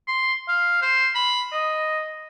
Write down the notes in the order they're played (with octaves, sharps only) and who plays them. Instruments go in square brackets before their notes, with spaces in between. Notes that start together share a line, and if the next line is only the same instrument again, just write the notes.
[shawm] C6
F5
C5
B5
D#5